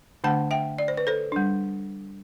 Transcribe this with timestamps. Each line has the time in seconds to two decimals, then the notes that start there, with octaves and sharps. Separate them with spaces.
0.24 D3 A3 D4 F#5 A5
0.51 E5 G5
0.79 D5
0.88 C5
0.97 B4
1.07 A4 C5
1.32 G3 D4